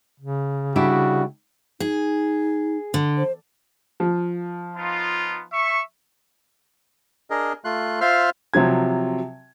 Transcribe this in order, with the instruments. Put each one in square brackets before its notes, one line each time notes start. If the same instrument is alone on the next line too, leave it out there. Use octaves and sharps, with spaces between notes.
[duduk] C#3
[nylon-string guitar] G3 D4 E4 [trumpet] F#4
[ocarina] D#4 [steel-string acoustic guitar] G#4
[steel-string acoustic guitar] D3
[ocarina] C5
[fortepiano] F3
[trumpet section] B3 D#4 F4
E5 C#6
[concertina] D4 G#4 A#4 D#5
A3 F4 C6 F#6
F4 C5 E5 F5 C6 F6
[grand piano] C3 F3 F#3 G#6